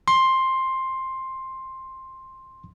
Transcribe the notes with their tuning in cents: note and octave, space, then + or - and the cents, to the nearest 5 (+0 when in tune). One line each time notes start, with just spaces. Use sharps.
C6 +10